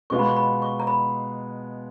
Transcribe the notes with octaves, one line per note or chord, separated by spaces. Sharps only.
B2 G#3 B3 F4 C#6
B5
C#6
B5
C#6
A#5
B5